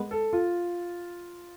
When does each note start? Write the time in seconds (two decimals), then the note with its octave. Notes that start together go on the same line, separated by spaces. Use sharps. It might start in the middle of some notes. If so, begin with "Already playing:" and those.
Already playing: G#3 B3 B4
0.11 A4
0.33 F4